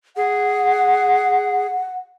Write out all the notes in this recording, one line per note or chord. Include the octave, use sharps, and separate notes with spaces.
G#4 F#5